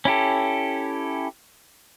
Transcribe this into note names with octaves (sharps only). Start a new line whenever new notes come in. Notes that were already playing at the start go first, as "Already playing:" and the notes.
C#4 E4 G4 A4